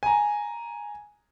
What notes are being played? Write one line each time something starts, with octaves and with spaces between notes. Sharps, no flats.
G#5 A#5